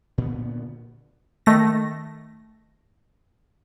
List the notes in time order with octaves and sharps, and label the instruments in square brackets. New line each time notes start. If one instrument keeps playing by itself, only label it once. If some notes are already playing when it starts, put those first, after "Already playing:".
[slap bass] A#2 D3 B3
[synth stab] D#3 A3 A#6